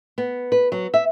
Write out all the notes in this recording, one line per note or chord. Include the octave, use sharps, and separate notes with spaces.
B3
B4
F#3
E5